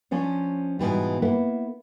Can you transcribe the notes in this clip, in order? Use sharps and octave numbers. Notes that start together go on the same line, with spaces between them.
F3 C#4 D4 C#5
G#2 B2 E3 G3
A#3 B3 E4